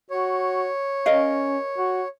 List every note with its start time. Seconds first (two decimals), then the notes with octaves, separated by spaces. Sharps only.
0.10 F#4 C#5
1.06 C#4 A#4 D#5 F5
1.78 F#4